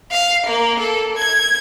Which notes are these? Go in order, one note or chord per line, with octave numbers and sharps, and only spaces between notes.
F5
A#3
A4
G#6